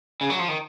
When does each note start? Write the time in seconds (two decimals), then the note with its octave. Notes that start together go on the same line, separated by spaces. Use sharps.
0.21 C#3
0.30 F#3
0.39 F3
0.48 D#3